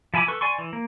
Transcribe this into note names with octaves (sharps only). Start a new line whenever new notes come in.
F3 E4 G#5 B5 D6
A4 B4 C#6
D5 G#5 C6 C#6
E3
A#3